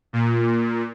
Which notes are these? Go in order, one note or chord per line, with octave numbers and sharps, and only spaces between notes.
A#2